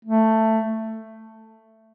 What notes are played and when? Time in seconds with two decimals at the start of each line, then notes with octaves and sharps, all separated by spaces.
0.05 A3